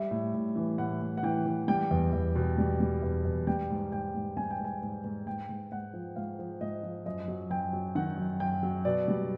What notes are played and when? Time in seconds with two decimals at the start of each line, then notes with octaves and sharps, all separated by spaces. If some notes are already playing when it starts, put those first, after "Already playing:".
Already playing: G3 E5
0.11 A2
0.34 A2
0.56 E3
0.78 A2 F#5
1.01 A2
1.17 F#5
1.23 E3 G5
1.46 E3
1.68 G3 G5
1.91 E2
2.13 E2
2.35 B2
2.58 G3
2.80 G3
3.03 E2
3.25 E2
3.47 G3 G5
3.70 G#2
3.92 G#2 G5
4.15 G#2
4.37 G3 G#5
4.51 G5
4.60 G#2 G#5
4.82 G#2
5.04 G#2
5.27 G#2 G5
5.49 G#2
5.72 G#2 F#5
5.94 F3
6.16 G#2 F5
6.39 F3
6.61 G#2 D#5
6.83 F3
7.06 F#2 D#5
7.28 F#3
7.50 F#2 G5
7.73 F#3
7.95 D#3 F#5
8.18 F#2
8.40 F#2 G5
8.63 F#3
8.85 B2 D5
9.08 G3